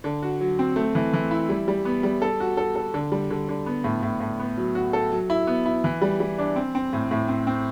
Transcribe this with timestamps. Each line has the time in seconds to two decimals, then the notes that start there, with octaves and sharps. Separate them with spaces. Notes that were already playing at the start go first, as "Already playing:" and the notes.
0.04 D3
0.23 F#4
0.41 F#3
0.59 C4
0.76 A3
0.95 E3
1.13 E3
1.31 E4
1.49 G3
1.68 G3
1.85 B3
2.03 G3
2.22 A4
2.40 F#4
2.57 A4
2.76 A4
2.94 D3
3.12 G3
3.30 D3
3.49 D3
3.66 B3
3.84 A2
4.03 A2
4.21 A2
4.40 B3
4.57 F#3
4.75 F#4
4.93 A4
5.12 F#3
5.30 E4
5.47 B3
5.66 E4
5.84 E3
6.02 G3
6.20 G3
6.38 D4
6.56 C4
6.75 C4
6.93 A2
7.11 A2
7.28 C4
7.47 C4